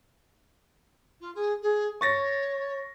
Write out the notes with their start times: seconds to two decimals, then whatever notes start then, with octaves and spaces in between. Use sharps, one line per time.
1.20 F4
1.34 G#4
1.62 G#4
2.01 C#5 C#6 A6 A#6